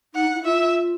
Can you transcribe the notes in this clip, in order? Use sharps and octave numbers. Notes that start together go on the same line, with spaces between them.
D#4 F#5
E4
F4 E5